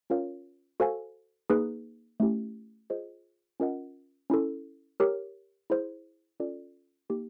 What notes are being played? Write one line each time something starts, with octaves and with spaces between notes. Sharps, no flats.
C#4 F4 A#4 C#5 F5
F#4 A4 C5 F5 G#5
A#3 D#4 G#4 B4
A3 C#4 E4 G4
F4 G#4 C5 D#5
C#4 F4 A#4 D#5 F#5
C#4 E4 A4
G4 A#4 C#5
E4 G#4 C5
C#4 F4 A4 D5
A#3 D#4 G4